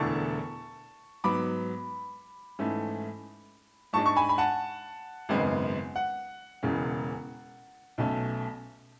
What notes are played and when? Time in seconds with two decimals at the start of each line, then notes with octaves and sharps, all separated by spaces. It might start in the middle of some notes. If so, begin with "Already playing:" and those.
Already playing: E1 E2 D3 A3 D4 A5 C#6
1.24 G#2 F#3 B3 B5 D6
2.59 G#2 E3 A3 C#4
3.93 G#2 G#3 D4 A5 C#6
4.06 C#6
4.16 G#5 B5
4.29 B5
4.38 F#5 A5
5.29 G#1 F#2 C#3 G#3 B3
5.96 F#5
6.63 E1 E2 C#3 G#3 C#4
7.98 B1 B2 A3 C#4